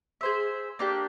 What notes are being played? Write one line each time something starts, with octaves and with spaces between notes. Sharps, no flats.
G#4 C5 E5
A#3 D4 G4